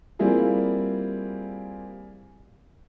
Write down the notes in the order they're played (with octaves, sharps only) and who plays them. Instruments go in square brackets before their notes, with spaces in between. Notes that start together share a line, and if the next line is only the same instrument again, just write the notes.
[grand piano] G3 A#3 C4 E4 F4 G#4